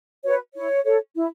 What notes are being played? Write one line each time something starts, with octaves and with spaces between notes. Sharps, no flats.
F#4 B4 C#5
E4 C#5
A4 C#5
E4